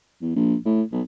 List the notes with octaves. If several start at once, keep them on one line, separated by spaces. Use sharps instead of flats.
E2
A#1
A2
B1